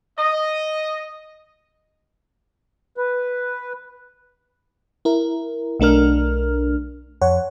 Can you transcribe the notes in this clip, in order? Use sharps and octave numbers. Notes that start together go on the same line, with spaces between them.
D#5
B4
E4 A#4
B1 A3 D4 A#4 F6
F2 C#5 F#5